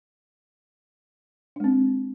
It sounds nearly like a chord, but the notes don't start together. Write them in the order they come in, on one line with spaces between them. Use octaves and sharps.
D4 G#3 C4